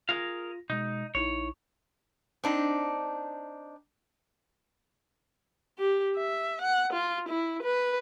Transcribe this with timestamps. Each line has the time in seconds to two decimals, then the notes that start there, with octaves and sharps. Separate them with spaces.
0.09 F4 G#4 A#4 F5 A#6
0.70 B2 G#3 D#4
1.15 A#1 D#4 E4 C#5
2.44 C4 D4 D#4
5.79 G4
6.17 E5
6.62 F#5
6.93 F4
7.29 E4
7.63 B4